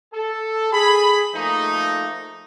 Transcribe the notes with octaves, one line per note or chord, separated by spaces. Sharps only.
A4
G#4 B5
F3 A3 A#3 D#4